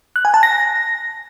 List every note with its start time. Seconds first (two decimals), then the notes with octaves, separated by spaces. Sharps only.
0.16 F#6
0.25 G#5
0.34 A5
0.43 A#6